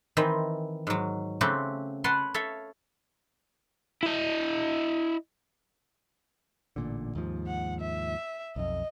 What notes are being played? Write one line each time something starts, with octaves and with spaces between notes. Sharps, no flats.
D#3 E3 C4
G#2 F#3
C#3 A3 C4 F#4 G4
B4 C#5 F#5 A5 C6
A4 C#5 E5 F5
E4 D#5
A1 A#2 D3
D#2 G#2 F3
F#5
E5
B1 F2 D#5